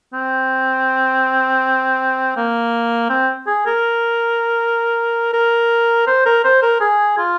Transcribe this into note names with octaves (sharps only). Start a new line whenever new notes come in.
C4
A#3
C4
G#4
A#4
A#4
C5
A#4
C5
A#4
G#4
F4